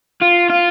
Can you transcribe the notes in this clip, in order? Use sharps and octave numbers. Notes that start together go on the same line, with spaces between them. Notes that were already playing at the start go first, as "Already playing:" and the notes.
F4
F4